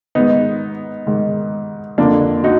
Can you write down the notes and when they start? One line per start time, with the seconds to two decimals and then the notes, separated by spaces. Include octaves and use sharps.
0.15 G#2 D#3 B3 D#4
1.07 G#2 D#3
1.98 F2 D3 A#3 D4
2.44 D#4 F#4